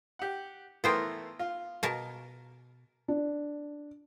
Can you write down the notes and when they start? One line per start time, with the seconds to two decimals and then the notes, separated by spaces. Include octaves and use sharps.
0.19 G4 F#5
0.84 E3 A3 B3 A#4 C5 G5
1.39 F4
1.83 B2 A#4 A5
3.08 D4